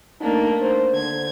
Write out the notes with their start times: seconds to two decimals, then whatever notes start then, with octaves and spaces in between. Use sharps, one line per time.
0.21 A3 A#3 D4 D#4
0.62 C5
0.93 D3 G#6